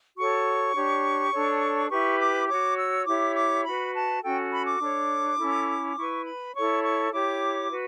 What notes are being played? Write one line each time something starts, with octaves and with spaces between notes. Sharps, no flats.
F#4 A4 C#5 C#6
D4 G4 C#5
D4 A4 C#5
E4 G4 B4 C#6
D6
F#4 C#5 D6
E6
E4 G4 C#5 D6
D6
F#4 B4 B5
A5
C#4 F#4 A4 G5
B5
D6
D4 A4 C#5
C#4 E4 A4
E4 B4 C#6
B5
E4 A4 C#5 C#6
C#6
E4 G4 C#5 D6
F#4 B4